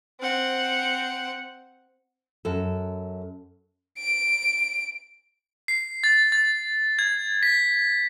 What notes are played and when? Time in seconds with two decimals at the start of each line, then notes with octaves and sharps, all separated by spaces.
0.20 C4 F#5
2.45 F#2 A4
3.98 D7
5.68 C7
6.04 A6
6.32 A6
6.99 G#6
7.43 B6